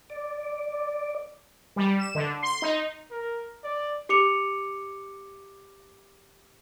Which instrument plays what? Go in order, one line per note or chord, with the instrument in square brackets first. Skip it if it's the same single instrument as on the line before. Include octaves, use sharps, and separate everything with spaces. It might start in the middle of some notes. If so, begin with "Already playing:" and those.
[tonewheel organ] D5
[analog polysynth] G3
E7
D3
C6
D#4
[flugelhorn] A#4
D5
[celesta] G4 D6 C#7 F7